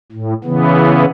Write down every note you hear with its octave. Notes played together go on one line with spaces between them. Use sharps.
A2
C#3 E3 B3